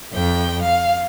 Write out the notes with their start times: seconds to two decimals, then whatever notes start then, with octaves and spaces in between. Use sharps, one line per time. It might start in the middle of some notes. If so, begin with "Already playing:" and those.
0.13 F2 G5
0.62 F5